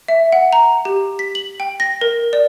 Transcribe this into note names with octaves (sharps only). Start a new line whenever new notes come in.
E5
F#5
A#5
G4
B6
F#7
G5
A#6
A#4
D5